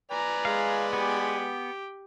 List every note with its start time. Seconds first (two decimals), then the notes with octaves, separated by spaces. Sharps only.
0.11 B4 D5 G#5 A#5
0.45 G#3 F5
0.93 B3 G4